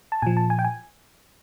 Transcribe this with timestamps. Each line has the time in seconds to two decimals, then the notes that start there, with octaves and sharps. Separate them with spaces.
0.12 A5
0.22 A#2 F3 G#5
0.37 A5
0.50 G#5
0.59 G5
0.64 G#5